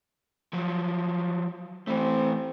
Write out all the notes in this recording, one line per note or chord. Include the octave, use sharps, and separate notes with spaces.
F3 F#3
E3 A3 C4